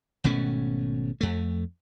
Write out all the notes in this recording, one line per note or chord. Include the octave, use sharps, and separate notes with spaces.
G#1 B2 A3 C#4
F2 A3